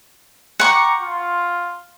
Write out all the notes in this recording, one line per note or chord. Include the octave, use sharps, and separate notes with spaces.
F#5 G5 A#5 C#6 D6
F4